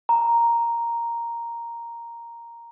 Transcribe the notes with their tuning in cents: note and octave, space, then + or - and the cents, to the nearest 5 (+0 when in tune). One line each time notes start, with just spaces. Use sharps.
A#5 +0